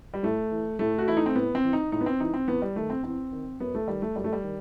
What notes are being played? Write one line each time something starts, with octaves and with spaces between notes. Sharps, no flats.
G3
A2 A3
E3
A2 A3
F#4
E3 E4
D#4
C4
A2 B3
C4
E3
D#4
A2 D#4
B3
C4
E3 D#4
C4
E2 B3
G3
D#3 A3
C4
E2 C4
D#3
F#2 B3
A3
D#3 G3
A3
F#2 G3
A3
G3
D#3